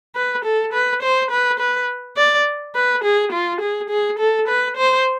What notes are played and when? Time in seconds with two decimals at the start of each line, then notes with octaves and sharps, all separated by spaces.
0.15 B4
0.45 A4
0.73 B4
1.03 C5
1.31 B4
1.60 B4
2.17 D5
2.75 B4
3.04 G#4
3.33 F4
3.61 G#4
3.90 G#4
4.19 A4
4.48 B4
4.77 C5